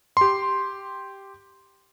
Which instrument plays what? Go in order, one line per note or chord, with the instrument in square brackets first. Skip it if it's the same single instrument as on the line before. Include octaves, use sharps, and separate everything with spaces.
[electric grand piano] G4 C6